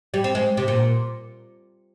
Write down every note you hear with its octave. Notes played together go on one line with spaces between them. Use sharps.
G3
C4
G#3
C3
A#2